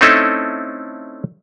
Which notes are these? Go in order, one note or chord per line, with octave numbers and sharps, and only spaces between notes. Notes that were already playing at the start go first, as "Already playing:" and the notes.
A3 C4 C#4 D#4 E4 A4